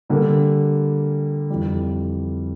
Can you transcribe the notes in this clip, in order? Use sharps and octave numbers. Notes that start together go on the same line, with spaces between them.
D3 G3 A#3
F2 E3 G3